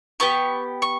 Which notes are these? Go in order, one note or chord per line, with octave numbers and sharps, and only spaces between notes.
B3 G4 C#6
C#6